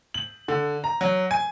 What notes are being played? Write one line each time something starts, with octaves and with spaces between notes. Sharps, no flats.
F#7
D3
A#5
F#3
G#5